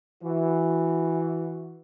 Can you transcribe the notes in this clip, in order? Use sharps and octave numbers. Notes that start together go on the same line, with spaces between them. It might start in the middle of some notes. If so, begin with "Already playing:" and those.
E3 F#4